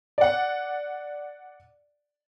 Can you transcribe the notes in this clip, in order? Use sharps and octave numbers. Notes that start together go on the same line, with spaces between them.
D5 F#5